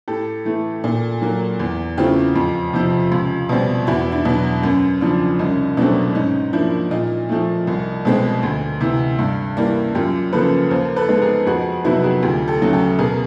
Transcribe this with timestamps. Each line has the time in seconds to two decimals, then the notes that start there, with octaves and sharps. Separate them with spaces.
0.08 A2 G4 A4
0.45 E3 A3
0.84 A#2
1.22 F#3 A#3
1.60 E2
1.98 C#3 E3 A3 C4 F4 G4
2.36 F2
2.74 C3 F3
3.12 C#2
3.49 B2 G3 C4
3.87 E2 E4 F#4
4.12 D4 E4
4.25 B2 F#3
4.63 F#2 C#4
5.01 C#3 F3 D4
5.39 C2 C#4 D#4
5.77 B2 F#3 A3 C4 D4
6.15 G#2 C#4 D#4
6.53 F3 A#3 D4 E4
6.91 A#2 D#4 F4
7.29 F3 A3
7.67 C2
8.05 B2 G#3 C4
8.43 D2
8.81 C3 E3
9.19 G2
9.57 E3 G3 A#3
9.95 F#2 F4 G4
10.33 C#3 F3 A#3 A4 B4
10.70 D#2 A#4 C5
10.96 A4 B4
11.09 D#3 G#3 B3
11.22 G#4 A#4
11.47 F2 F#4 G#4
11.85 C3 D#3 F#3 B3 E4 F#4
12.04 F#4 G#4
12.23 D2 F4 G4
12.48 G4 A4
12.61 C#3 F#3 A3
12.73 G4 A4
12.98 B2 G#4 A#4